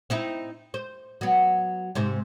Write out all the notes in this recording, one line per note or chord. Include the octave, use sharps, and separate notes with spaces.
C4 D#4 E4
C5
F#3 B3
G#2 C3 C4